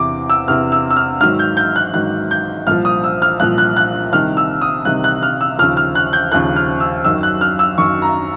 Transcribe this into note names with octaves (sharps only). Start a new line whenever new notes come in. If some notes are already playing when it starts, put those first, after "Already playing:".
Already playing: E2 C3 E3 D6
E6
E2 C3 E3 F6
E6
E6
F6
G#2 D#3 F#3 F6
G6
G6
F#6
G#2 D#3 F#3 F#6
G6
C2 A#2 F3 F6
D#6
E6
F6
C2 A#2 F3 F#6
F#6
F#6
C2 C3 D#3 F6
E6
D#6
C2 C3 D#3 F#6
F#6
F6
E6
D#2 C#3 F3 F6
F6
F#6
G6
D#2 C#3 F3 F#6
F6
E6
F#2 D#3 F#3 E6
F#6
F6
E6
F#2 D#3 F#3 C#6
A#5